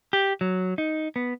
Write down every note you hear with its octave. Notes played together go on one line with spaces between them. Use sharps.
G4
F#3
D#4
B3